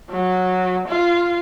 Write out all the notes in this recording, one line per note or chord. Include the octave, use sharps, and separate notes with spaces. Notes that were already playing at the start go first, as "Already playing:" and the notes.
F#3
F4